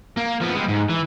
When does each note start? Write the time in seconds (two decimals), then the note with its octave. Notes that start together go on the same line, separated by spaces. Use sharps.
0.17 A#3
0.41 F3 B3
0.55 G3 G#3
0.68 G#2
0.89 E3